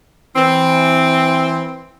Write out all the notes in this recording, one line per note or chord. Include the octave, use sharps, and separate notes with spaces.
E3 C4